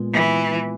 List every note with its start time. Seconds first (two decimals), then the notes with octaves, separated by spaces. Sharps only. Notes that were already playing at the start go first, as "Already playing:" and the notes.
Already playing: A#2 G#3 B3
0.13 E3